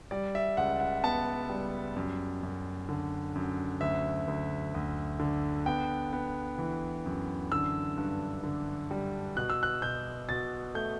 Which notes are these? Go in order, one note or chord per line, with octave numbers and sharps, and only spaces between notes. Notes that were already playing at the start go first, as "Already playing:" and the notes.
G3 D5
E5
C#2 F#5
F#5
B3 A5
G3
F#2
F#2
D3
F#2
D2 E5
D2
D2
D3
B3 G5
B3
E3
F#2
D3 E6
G2
D3
G3
B2 F#6
E6
F#6
B2 G6
B2 A6
A3 G6